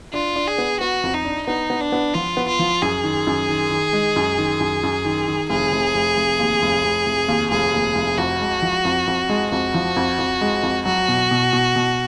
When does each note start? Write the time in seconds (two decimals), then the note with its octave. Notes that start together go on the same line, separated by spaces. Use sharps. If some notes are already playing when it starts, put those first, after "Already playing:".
0.13 D4 F4
0.36 D4
0.48 G#4
0.58 B3
0.80 B3 F#4
1.04 F2
1.14 D#4
1.25 D4
1.47 B3 D#4
1.70 B3
1.81 D4
1.92 B3
2.14 F3 F4
2.37 B3
2.49 F4
2.59 F3
2.82 F#2 G#4
3.04 D#3
3.27 F#2
3.49 D#3
3.71 D#3
3.93 G#3
4.16 F#2
4.38 D#3
4.60 F#2
4.83 F#2
5.05 D#3
5.27 D#3
5.50 F1 G#4
5.72 F1
5.94 F1
6.17 F1
6.39 D#2
6.62 F1
6.84 F1
7.06 F1
7.28 D#2
7.51 F1 G#4
7.73 D#2
7.95 F1
8.18 F2 F#4
8.40 G#3
8.62 F3
8.85 F2
9.07 F2
9.29 G#3
9.52 F2 F#4
9.74 F3
9.96 F2
10.19 F2
10.41 G#3
10.63 F2
10.85 F#3 F#4
11.08 B2
11.31 B2
11.53 B2
11.76 B2